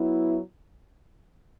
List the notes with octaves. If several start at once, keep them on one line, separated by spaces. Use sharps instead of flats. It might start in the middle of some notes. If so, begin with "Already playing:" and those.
Already playing: F#3 B3 E4